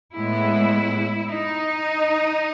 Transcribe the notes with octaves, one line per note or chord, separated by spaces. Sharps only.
A2 G#3 B3 E4
D#4